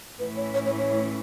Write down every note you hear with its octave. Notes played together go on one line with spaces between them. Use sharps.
A2 E3 C#4 E4 B4
C#5
C#5
C#5
C#5